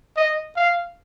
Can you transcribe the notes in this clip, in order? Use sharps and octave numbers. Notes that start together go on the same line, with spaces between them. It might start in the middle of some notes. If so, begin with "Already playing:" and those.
D#5
F5